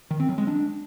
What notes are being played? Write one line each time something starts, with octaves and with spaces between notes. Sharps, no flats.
D#3
C4
F#3
G#3
D4